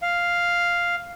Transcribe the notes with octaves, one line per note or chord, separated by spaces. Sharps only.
F5